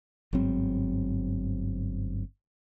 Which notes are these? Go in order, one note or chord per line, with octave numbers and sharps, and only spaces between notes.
G1 G#2 F#3 C4